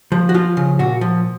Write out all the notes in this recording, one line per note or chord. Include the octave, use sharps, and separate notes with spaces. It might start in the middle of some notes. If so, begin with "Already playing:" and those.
F3
F#4
F3 F4
C#3
A#2 F#4
F3